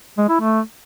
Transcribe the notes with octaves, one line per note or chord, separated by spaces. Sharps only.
G#3
E4
A3